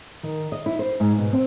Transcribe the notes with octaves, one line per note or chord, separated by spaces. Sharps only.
D#3
D#5
E4
C5
G#2
B2
C4